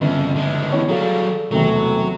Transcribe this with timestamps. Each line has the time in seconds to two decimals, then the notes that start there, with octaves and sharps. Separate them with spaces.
0.01 G1 F2 C#3
0.35 D3 G#3
0.72 E3 B3 C#5
0.88 F#3 G3 G#4 A4 F5
1.51 E1 C3 F#3 A3